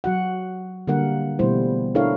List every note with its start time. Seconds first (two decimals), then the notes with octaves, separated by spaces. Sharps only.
0.04 F#3 F#4 F#5
0.87 D3 G3 A#3 A#4 F#5
1.39 B2 E3 G3 A3 E4 C5
1.95 D4 E4 A4 A#4 C#5 F5